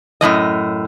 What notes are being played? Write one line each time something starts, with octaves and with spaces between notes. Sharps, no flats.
F#2 A2 F3 D#5